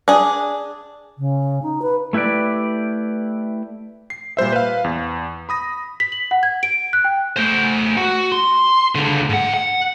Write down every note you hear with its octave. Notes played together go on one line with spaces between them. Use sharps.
D4 G#4
C#3
D#4
B4
A3 E4 G4 B4 D5
C7
A#2 G3 C5 E5
B4 F5
E2
B5 D#6 A#6
B6
F#7
F#5
G#6
D7
F#6
G5
A3 C5
F#4
C6
C#2 D3
G#2 F#5
F#5